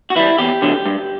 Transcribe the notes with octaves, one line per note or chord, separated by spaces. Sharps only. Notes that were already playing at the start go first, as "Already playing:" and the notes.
F#4
E3 G3 E4
E2 G4
D3 F#3
G2